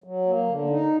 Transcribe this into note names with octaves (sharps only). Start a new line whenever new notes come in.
F#3
A#3
D3
D#4